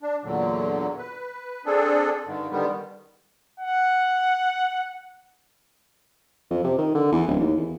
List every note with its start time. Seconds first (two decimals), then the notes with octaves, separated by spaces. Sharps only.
0.02 D4
0.24 E2 A#2 D3 F#3
0.98 B4
1.66 C4 D4 G#4 A4
2.26 G2 D3 D#3
2.51 D3 D#3 G3 B3
3.60 F#5
6.50 F2
6.64 C3
6.78 D#3
6.95 D3
7.12 E2
7.27 D1
7.40 D#2
7.57 E2